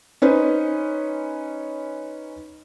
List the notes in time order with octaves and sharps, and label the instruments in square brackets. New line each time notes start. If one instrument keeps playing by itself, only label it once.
[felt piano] C#4 D#4 B4 C5